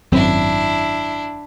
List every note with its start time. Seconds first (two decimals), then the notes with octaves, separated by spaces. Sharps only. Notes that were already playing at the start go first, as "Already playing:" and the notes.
0.12 G#1 F#2 C4 D4 E4